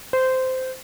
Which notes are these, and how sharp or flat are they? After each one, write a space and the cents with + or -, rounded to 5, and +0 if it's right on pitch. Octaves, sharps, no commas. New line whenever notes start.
C5 -15